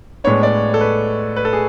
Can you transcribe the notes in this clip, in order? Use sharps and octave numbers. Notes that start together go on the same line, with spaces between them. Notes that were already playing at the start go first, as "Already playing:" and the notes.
A2 G#3 B3 D4 C#5
D5
A4
B4
B4
A4
G#4